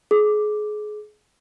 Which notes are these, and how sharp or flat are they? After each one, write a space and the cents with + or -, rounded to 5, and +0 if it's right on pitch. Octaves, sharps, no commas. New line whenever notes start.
G#4 +25 D6 +0